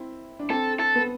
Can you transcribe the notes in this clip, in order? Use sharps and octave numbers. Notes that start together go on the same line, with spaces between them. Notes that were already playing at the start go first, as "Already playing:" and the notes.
Already playing: C4 E4
D4
C4 A4
A4
B3